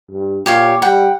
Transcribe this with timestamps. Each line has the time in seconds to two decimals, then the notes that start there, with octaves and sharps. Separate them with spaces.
0.11 G2
0.46 A#2 G4 C#5 F5
0.82 G3 F#5 G5